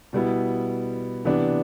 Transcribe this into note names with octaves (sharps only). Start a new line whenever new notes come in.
B2 G3 B3 E4
C3 E3 B3 D4